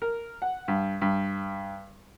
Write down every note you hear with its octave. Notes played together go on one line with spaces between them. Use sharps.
A#4
F#5
G2
G2